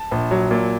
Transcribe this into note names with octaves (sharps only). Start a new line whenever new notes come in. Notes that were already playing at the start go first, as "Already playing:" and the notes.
Already playing: A5
A#1
F#3
A#2